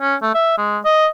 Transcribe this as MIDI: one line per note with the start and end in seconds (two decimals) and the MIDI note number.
0.01 0.15 61
0.22 0.32 57
0.34 0.56 76
0.58 0.78 56
0.85 1.07 75